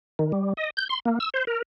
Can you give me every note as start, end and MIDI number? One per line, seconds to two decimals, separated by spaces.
0.19 0.32 51
0.32 0.53 55
0.57 0.70 75
0.77 0.88 91
0.89 0.99 84
1.05 1.19 58
1.20 1.30 88
1.34 1.45 72
1.47 1.62 70